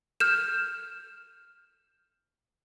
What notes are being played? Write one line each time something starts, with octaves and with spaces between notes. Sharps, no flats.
F6 G6 E7